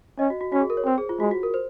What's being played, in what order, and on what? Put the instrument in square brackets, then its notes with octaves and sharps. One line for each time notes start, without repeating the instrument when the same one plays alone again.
[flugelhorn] C#4 [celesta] D#5
[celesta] F#4
F#4
[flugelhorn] C#4 [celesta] F#4
[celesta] G#4
A#4
C#5
[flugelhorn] C4 [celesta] C5
[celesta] G#4
F4
[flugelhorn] G#3 [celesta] F#4
[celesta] F#4
A#4
C5